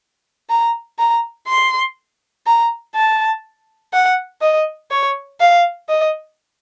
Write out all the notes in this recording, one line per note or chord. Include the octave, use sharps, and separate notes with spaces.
A#5
A#5
C6
A#5
A5
F#5
D#5
C#5
F5
D#5